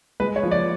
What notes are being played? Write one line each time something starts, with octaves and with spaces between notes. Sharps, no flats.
G#3 B4
C#5
F3
D5